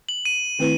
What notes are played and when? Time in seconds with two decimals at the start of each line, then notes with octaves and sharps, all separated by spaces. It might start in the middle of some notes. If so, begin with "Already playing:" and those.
0.09 F#7
0.25 D#7
0.59 D#3 A3 C4 E4 B4